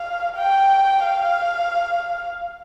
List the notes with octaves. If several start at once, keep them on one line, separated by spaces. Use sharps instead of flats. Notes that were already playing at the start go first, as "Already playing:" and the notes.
Already playing: F5
G5
F5